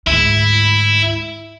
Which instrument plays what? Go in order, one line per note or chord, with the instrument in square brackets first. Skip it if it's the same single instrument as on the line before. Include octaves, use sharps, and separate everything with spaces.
[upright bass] D2 G#2 [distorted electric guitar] E4